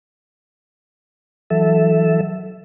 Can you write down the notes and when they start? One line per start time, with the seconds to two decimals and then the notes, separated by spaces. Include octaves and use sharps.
1.50 E3 F#3 A4 E5